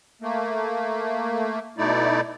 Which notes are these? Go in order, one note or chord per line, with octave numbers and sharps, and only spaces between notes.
A3 A#3
B2 A3 D#4 E4 D5